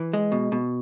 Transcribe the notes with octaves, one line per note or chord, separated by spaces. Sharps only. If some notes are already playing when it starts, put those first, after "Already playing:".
Already playing: E3
G#3
B2
B2